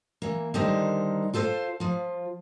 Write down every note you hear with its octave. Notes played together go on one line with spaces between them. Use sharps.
E3 A#3
D3 D#3 G3 D#4 A#4 C5
F4 A4 C5 D#5 F5
F3 F4